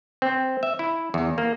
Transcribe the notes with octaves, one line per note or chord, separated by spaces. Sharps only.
C4
E5
E4
E2
A#3